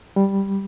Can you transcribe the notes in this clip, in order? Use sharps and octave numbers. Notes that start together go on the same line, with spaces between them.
G3